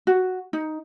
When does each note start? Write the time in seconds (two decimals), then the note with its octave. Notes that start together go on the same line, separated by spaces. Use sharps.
0.07 F#4
0.53 D#4